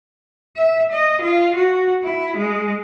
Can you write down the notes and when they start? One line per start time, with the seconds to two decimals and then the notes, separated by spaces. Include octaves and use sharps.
0.57 E5
0.92 D#5
1.22 F4
1.56 F#4
2.04 E4
2.37 G#3